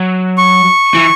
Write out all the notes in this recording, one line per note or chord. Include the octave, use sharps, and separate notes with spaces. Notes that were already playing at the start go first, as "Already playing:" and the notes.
Already playing: F#3
C#6
E3